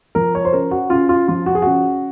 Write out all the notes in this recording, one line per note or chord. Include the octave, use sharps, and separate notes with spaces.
F3 A#4
C#5
C5
C#3 A#4
F#4
C#3 F4
F4
F3 F4
F#4
G#4
C#3 F#4